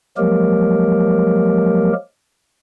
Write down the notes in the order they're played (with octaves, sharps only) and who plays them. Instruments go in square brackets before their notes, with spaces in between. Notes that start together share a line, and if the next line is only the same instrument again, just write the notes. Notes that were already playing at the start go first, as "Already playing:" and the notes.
[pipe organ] F3 F#3 G#3 A#3 G4 A#4